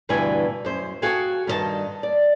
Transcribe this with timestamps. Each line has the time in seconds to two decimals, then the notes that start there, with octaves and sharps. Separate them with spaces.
0.09 D2 G2 B2 E3 D4 G#5
0.65 F#2 C5
1.02 F#4 G#4 A4 F5 G5 G#5
1.47 G2 D#3 F4 C5 D#5 A5
2.03 D5